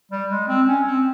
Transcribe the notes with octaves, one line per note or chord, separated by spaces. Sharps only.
G3
G#3
C4
C#4
C4